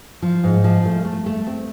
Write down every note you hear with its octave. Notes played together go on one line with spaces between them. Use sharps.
F3
G#2
F3
A3
A3
A3
C4